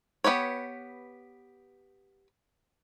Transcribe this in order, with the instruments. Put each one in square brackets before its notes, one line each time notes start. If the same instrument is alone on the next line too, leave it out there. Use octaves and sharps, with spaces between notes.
[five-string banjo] B3 G4 B4 C#5